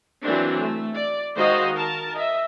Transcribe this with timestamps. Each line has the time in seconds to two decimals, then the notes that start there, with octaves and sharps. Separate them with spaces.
0.22 E3 F#3 A#3 C4 D4
0.59 A3
0.94 D5
1.36 D#3 G#3 F#4 C5 D#5 F5
1.74 A#4 A5
2.14 D#5 E5